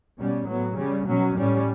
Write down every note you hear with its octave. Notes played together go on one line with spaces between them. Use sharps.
B2 G3 C#4
A2 F#3 B3
C#3 G3 C#4
B2 F#3 C#4
A2 G3 C#4